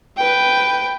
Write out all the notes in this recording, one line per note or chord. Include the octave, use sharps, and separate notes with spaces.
B4 G5